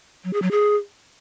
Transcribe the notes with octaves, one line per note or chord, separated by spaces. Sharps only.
F#3
G#4
F#3
G#4